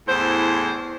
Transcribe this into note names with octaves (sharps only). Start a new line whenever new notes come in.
E2 A2 C5